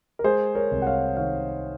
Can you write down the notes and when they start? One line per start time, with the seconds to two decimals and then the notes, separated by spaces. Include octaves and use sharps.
0.19 A#4
0.24 G#3 G#4 C5
0.55 A#4 C#5
0.71 C2
0.82 F#5
0.87 C#5 F5
1.17 D#3 C#5 F5